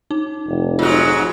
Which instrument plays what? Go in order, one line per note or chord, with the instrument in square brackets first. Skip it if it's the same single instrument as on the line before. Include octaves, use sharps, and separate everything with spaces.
[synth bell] D#4
[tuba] F1
[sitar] G#2 F#3 [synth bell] F4 F#6